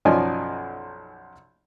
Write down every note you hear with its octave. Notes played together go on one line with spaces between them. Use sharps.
B1 F#2 F3 D#4 D5 G#5